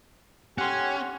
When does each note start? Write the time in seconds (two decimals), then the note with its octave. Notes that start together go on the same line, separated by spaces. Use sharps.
0.58 C#4 G4 F#5 G#5 C6